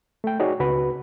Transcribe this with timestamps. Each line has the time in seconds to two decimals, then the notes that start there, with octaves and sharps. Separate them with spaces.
0.24 A3 G5
0.40 D#4 F#4 G#4 C#5 D5
0.60 C#2 C#3 F#4 B4 B5